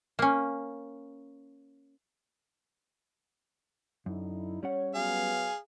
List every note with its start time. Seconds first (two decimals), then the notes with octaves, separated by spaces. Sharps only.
0.19 A#3 C#4
4.06 F#2 D3 D#4 E4
4.63 G3 C#4 C#5 F#5
4.95 F#3 B3 G#4 F5